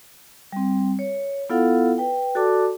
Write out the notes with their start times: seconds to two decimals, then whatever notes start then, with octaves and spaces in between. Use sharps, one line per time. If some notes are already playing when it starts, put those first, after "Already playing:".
0.52 G3 C4
0.99 C#5
1.50 B3 E4 F4 A4 F5 F#5
1.98 B4 G5
2.35 F#4 A4 D5 A5 D6